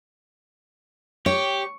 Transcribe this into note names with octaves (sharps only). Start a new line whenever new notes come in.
G4 C#5 C#6